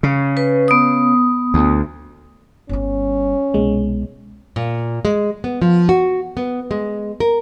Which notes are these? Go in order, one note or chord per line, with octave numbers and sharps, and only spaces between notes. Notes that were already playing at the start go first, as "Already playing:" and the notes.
C#3
B4
B3 D#6
D2
G1 G2 C#4
C2 B2 G#3
A#2
G#3
B3
F3
F#4
B3
G#3
A#4